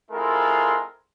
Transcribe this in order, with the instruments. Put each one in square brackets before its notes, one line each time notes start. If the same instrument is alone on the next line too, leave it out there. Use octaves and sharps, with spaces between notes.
[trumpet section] G#3 C4 E4 F4 A4 A#4